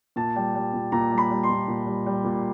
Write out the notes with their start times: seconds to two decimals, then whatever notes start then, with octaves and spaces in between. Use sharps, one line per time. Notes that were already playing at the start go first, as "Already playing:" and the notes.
0.16 A#2 A5
0.36 G3
0.55 G3
0.74 A#2
0.92 A#2 A#5
1.12 G3
1.18 B5
1.31 G3
1.43 C6
1.50 A#2
1.68 A#2
1.86 G3
2.06 G3
2.24 A#2